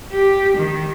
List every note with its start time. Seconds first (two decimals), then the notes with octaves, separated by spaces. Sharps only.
0.12 G4
0.58 D#3